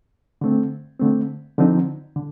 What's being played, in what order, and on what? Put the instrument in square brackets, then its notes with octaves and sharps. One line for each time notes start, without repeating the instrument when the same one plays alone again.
[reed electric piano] D3 A3 C4
D3 A3 C4
D3 F3 C4 D#4
D3